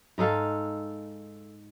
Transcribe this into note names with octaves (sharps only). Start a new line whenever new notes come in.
G#2 D#4 A4 F5